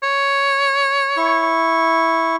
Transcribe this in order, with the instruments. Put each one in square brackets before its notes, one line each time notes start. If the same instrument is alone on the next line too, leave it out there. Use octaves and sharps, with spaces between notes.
[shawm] C#5
[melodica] E4 C#6